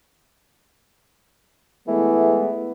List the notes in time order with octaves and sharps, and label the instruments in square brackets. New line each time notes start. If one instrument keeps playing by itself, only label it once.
[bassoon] E3 [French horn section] G#3 A3 B3